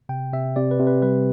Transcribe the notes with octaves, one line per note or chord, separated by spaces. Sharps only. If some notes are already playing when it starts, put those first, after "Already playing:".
C3 G5
C3 E5
C3 D5
B4
C3
B4
G3 B4